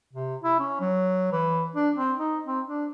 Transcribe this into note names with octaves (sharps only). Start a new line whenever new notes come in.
C3
E4
C#4
F#3
E3
D4
C4
D#4
C4
D4